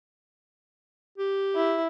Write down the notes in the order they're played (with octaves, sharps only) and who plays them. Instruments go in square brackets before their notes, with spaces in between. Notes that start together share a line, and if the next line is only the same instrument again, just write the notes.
[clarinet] G4
[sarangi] E4